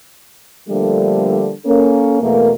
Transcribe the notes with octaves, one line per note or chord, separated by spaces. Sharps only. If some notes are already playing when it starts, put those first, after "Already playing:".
D3 F3 G3 A3 A#3 D4
A#3 C#4 A4
E2 B2 A3 A#3